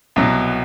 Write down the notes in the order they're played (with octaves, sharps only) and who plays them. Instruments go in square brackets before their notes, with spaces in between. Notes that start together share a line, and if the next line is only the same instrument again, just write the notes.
[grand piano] C2 B2 F#3